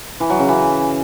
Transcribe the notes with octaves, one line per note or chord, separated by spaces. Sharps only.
E3
F#3
C#3
E3